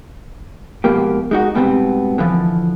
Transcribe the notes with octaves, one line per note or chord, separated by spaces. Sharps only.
G#2 B2 F3 A#3 G4
G#3 D#4 F#4
G#2 B2 G3 G#3 B3 C4
D3 E3 F3